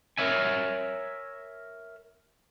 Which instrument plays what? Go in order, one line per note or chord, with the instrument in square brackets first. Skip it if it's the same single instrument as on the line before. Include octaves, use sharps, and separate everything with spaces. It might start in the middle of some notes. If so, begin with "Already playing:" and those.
[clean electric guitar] A#4 C5 C#5 E5 G#5